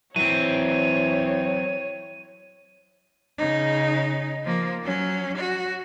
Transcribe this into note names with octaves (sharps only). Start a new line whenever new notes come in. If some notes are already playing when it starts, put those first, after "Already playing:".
E3 F#3 C4 C#5 D#7
C#3 D#4
F3 A#3
F#3 C#4
F#4